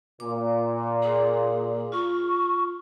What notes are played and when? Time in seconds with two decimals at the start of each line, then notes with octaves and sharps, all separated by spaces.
0.20 A#2 D6
1.02 G#4
1.92 F4 C#6